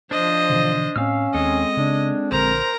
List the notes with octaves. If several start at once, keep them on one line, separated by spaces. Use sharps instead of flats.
F3 D4 C5 D#5
B2 D3 E3
A2 C4 C#4 F5 E6 F6
D#2 G#3 C4 A4 D#5
C#3 D4
A#1 D3 A#4 C5 A#5